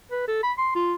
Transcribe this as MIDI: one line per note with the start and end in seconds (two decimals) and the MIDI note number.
0.11 0.23 71
0.28 0.42 69
0.43 0.53 83
0.58 0.74 84
0.75 0.95 65